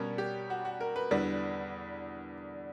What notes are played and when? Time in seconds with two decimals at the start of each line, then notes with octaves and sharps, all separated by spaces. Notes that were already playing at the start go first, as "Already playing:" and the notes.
Already playing: B2 G3 C#4 A#4
0.18 G4
0.50 F#4
0.65 F#4
0.81 A#4
0.96 B4
1.11 E2 D3 G3